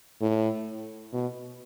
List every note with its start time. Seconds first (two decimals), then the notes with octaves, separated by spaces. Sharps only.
0.21 A2
1.13 B2